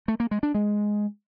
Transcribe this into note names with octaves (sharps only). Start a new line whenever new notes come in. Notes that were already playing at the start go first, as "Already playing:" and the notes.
A3
A#3
G#3
D4
G#3